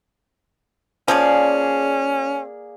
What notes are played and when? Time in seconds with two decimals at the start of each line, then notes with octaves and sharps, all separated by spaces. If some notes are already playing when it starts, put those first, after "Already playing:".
1.08 F3 A#3 C#4 G#4 D5